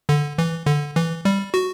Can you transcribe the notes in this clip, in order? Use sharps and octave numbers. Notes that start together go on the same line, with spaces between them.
D3
E3
D3
E3
G3
F#4